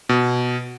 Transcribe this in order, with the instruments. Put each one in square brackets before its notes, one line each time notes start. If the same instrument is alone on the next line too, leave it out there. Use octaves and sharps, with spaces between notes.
[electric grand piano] B2